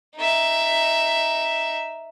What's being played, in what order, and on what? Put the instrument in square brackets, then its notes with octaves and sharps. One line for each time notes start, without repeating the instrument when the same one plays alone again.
[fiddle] D#4 E5